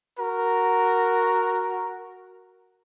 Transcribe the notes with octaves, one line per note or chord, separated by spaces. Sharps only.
F#4 A#4